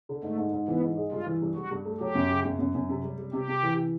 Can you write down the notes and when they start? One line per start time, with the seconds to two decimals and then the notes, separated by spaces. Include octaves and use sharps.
0.09 D3
0.23 G#2 A3
0.38 G#2
0.53 G#2
0.68 E3 B3
0.82 G#2
0.97 G#3
1.11 G2 F4
1.26 E3
1.41 G2
1.56 G2 F#4
1.71 G2
1.85 A3
2.00 F#3 G4
2.15 F#2
2.30 C#3
2.45 F#2
2.59 F#2
2.75 F#2
2.89 C3
3.03 G3
3.18 G3
3.33 C3 G4
3.48 C3
3.63 E3